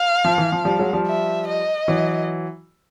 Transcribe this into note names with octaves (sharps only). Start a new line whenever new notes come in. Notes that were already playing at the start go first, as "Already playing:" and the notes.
Already playing: F5
F3
E3
F3
F3 G3
F#3 G#3
F3 G3
E5
D#5
E3 F#3